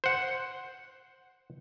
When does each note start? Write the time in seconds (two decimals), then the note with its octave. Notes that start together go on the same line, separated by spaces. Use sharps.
0.04 C5 F#5